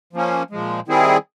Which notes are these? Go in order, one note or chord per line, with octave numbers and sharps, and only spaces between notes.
F3 A#3 C#4
A#2 F3 G#3
D#3 G3 C4 E4 G#4